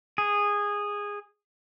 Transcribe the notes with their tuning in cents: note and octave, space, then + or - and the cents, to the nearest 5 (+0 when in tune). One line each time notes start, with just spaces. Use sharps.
G#4 -15